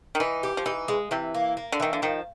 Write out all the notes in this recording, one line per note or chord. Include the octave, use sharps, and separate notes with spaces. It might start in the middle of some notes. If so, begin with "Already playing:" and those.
D#3
E3 D#4
G4
F3
E3 D#4
G#3
C3 E3
A#3
A#3
D3
D#3 E3
D3
D#3 F3